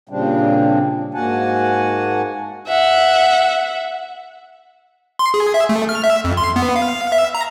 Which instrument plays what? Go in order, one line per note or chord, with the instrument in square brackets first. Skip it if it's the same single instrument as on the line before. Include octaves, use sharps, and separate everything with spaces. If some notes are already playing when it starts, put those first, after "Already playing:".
[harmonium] A#2 C#3 G3 C4 D4
G#2 A#3 F#4 F#5 G#5 A5
[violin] E5 F#5
[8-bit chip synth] C6
G#4
E5
A3
F6
E5
F2
C6
B3
F5
E5
A#5